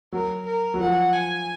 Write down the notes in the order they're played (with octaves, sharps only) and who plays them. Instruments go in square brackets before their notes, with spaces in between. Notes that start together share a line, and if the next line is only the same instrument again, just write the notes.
[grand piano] F#3 [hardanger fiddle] A#4
[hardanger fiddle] A#4
[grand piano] F#3
[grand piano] F3 [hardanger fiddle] F#5
[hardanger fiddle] G#5